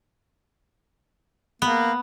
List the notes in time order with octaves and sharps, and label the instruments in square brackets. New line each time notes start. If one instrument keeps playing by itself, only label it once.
[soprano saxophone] A#3 [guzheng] B3